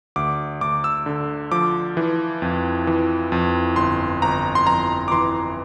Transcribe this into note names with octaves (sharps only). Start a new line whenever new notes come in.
D2 D6
D2 D6
E6
D3
F3 D6
E3
F2
E3
F2
G1 C6
G1 A#5
C6
F2 A#5
D6
E3 C6